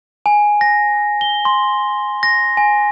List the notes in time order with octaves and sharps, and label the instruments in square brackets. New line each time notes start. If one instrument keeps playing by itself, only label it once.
[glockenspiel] G#5
A#6
G7
C6
A#6
G#5